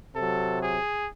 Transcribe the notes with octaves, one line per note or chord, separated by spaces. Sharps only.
C3 F#3 A4
G#4